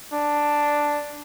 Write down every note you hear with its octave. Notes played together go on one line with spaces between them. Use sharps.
D4